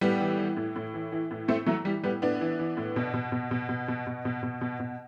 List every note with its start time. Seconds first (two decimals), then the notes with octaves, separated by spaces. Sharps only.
0.01 A2 G3 B3
0.20 E3
0.38 E3
0.57 A2
0.76 A2
0.94 E3
1.12 E3
1.31 A2
1.48 A2 A3 C4
1.66 E3 F#3 A3
1.85 E3 G3
2.03 A2 G3 B3
2.22 A2 B3 D4
2.41 E3
2.59 E3
2.77 A2
2.96 B2
3.14 B2
3.32 B2
3.51 B2
3.69 B2
3.88 B2
4.07 B2
4.25 B2
4.43 B2
4.61 B2
4.80 B2